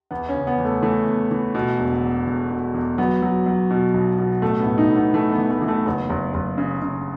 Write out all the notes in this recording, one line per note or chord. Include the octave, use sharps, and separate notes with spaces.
E2 B3
C#4
C#3
B3
E2
A3
E3 A3
E2
E3
B2
E1
E2
E2
B2
E2
F#3 B3
F#3
F#3
B2
B1
B2
A1 A3
B3
A2
D#4
A2
B3
E3 A3
B3
E3
A3
E3
A3
F#1 B3
F#1
F#1
C#3
C#3